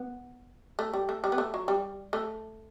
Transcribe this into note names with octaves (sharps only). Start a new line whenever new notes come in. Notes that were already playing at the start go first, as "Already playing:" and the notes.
Already playing: B3
A3
G3
A3
G3
B3
A3
F#3
G3
A3